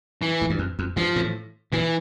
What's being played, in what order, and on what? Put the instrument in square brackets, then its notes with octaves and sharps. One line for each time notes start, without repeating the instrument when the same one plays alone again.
[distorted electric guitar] E3
[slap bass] A2
G2
F2
F2
[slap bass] G2 [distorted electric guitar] F3
[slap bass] A2
[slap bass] A#2 [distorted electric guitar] E3